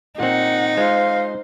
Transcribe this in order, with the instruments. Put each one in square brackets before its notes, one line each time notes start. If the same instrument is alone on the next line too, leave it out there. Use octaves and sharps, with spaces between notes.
[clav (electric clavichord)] A#2 C4 [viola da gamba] D#4 [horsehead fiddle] F#5
[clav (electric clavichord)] G#3 F4 [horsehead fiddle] C5 [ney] F5